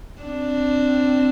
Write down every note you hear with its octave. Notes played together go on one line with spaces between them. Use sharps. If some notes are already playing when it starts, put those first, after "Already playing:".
C4 D4